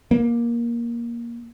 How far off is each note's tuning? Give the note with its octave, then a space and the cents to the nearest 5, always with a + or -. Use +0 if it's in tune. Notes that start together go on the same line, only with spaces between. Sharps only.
A#3 +15